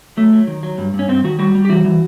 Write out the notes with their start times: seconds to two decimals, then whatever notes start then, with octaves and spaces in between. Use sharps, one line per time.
0.17 F#3 A3
0.33 F#3
0.47 D#3
0.63 F#3
0.78 G2
0.94 G2
0.99 C#4
1.09 G2 C4
1.24 D#3 F#4
1.39 G3 F#4
1.55 G3
1.65 G4
1.69 E3 F#4
1.85 E3